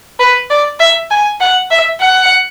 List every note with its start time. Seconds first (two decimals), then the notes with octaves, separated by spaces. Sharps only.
0.19 B4
0.51 D5
0.80 E5
1.11 G#5
1.41 F#5
1.71 E5
2.01 F#5